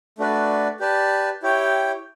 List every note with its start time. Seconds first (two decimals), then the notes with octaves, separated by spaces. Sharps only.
0.18 A3 D4 F#4 B4 D5
0.80 G4 B4 D5 A5
1.43 E4 G4 C#5 G5